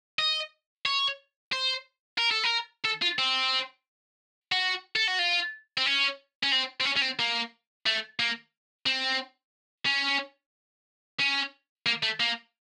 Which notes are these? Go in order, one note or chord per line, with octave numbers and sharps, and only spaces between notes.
D#5
C#5
C5
A#4
A4
A#4
A4
F4
C4
F#4
A4
F#4
F4
C4
C#4
C#4
C4
C4
C#4
C#4
C4
A#3
A3
A#3
C4
C#4
C#4
A#3
A3
A#3